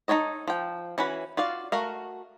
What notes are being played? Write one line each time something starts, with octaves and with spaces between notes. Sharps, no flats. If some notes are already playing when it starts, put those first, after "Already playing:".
D#4 F4 A4 C#5 D#5
F3 G5
E3 C#4 F#4 B4
F4 F#4 D5 F5
A3 F#4 A#4 F5